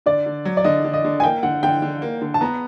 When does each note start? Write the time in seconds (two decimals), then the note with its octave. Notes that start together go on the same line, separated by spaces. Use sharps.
0.06 D3 D5
0.26 D3
0.45 F#3
0.57 D5
0.64 D3 D#5
0.85 D3
0.94 D#5
1.05 D3
1.20 G#5
1.23 A#3 G5
1.43 D3 F#5
1.63 D3 G5
1.82 D3
2.02 A#3
2.22 D3
2.34 A5
2.41 B3 A#5